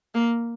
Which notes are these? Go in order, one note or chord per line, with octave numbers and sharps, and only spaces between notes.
A#3